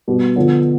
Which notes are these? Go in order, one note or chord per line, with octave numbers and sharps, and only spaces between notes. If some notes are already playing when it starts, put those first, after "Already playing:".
B2 G3 B3
D3 F3 B3 D4